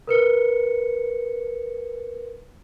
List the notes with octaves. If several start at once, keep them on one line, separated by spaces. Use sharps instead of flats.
A#4 B4 C#7